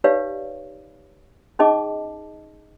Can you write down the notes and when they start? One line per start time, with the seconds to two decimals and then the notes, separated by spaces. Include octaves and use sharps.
0.04 D#4 G4 B4 C#5 D5 F5
1.59 C#4 D#4 G#4 D#5 A5 D6